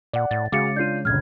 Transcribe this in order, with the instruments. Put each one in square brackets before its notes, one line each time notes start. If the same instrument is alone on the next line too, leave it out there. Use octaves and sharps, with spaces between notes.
[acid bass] A#2 [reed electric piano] D5 F#5
[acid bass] A2 [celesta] A6
[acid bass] C#3 [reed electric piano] G#3 [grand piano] F#4 G#4 F5 [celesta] D6 A6 C#7
[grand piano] D4 F4 [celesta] G6 C7 D#7
[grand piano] G1 C#2 [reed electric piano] A#2 [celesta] F6 G#6